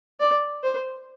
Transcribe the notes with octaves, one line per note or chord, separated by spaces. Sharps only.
D5
C5